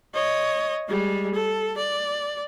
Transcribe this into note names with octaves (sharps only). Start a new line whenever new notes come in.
C#5 D#5
G3 G#3
A4
D5